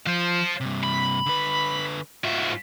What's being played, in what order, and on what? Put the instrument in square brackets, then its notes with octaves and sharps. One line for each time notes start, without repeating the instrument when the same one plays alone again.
[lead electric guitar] F3 [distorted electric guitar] C5 F5
[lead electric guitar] G2 C3
[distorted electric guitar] B5
[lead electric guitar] D3 B4
[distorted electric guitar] G#2 E5 [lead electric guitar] F4 F#4